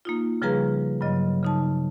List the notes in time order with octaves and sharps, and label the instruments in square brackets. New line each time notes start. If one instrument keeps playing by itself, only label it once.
[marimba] A#3 D#4 F4
C#3 F3 G3 G#4 B4 A#5
G2 C#3 F#3 D#5
C#3 D#4 A5